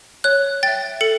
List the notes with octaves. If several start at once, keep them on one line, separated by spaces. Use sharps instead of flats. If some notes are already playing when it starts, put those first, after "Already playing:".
C#5 F#6
E5 G5 A6
A4 C#7